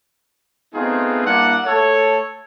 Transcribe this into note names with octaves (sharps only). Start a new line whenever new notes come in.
A3 B3 C4 D#4 F4 G#4
G3 A#3 D4 E4 F#5
A3 A4 C#5